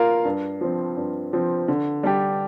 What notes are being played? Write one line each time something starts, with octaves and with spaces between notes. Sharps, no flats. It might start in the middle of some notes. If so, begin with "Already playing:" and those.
Already playing: A#3 F4 A#4 F5
G2
F3 C4
G2
F3 C4
D3
G3 D4 G4